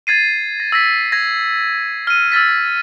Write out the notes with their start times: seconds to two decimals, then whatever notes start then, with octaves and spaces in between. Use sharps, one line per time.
0.07 G#6 A6 C7 D#7
0.60 A#6
0.72 E6 A#6 B6
1.12 G#6 A#6
2.07 F6 D#7
2.32 E6 F6 A6 B6